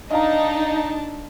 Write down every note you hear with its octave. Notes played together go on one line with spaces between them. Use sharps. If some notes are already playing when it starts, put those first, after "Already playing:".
D4 D#4 D#5 F5 A5 A#5